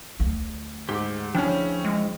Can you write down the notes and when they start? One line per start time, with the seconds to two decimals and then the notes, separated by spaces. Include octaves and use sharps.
0.20 D2
0.89 G#2 G4
1.35 F3 C#4 D4 E4 G#4 G5
1.85 G#3